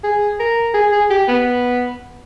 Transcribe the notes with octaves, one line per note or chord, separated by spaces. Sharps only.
G#4
A#4
G#4
G#4
G4
B3